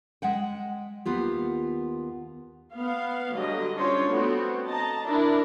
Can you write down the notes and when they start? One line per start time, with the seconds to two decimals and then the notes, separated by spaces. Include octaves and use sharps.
0.22 G#3 E5 F#5 G5
1.05 D#2 B3 F4 G4
2.74 B3 F5
3.34 D3 F#3 G3 D#5
3.74 C#4 D4 F4 C5 C#5
4.09 A3 B3 C4 F#4
4.68 D#5 A5 A#5
5.05 D4 E4 A#4